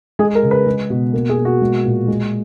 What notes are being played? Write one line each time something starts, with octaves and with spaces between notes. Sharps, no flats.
G#3 G#4
A#4
C#3
B4
G#3
B2
A#3
G#4
B2
F#4
G#3
A#2
G#3